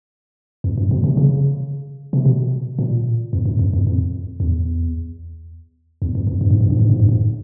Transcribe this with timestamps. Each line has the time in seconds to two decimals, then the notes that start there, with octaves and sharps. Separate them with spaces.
0.64 F2
0.78 F#2
0.91 B2
1.04 C3
1.17 C#3
2.13 C3
2.26 B2
2.79 A#2
3.33 F2
3.46 F#2
3.59 F2
3.73 F2
3.87 F2
4.40 E2
6.02 E2
6.15 F2
6.27 F2
6.41 G2
6.50 G#2
6.61 G2
6.70 G#2
6.79 G2
6.90 G#2
7.00 G2
7.09 G#2